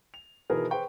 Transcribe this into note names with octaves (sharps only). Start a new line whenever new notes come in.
F7
B2 D#3 E3 B3 G#4 A#4
G#4 B4 C5 G5 C#6